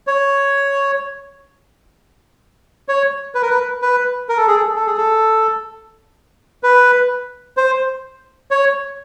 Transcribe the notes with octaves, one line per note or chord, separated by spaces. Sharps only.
C#5
C#5
B4
A#4
B4
B4
A#4
A4
G#4
A4
A4
G#4
A4
B4
C5
C#5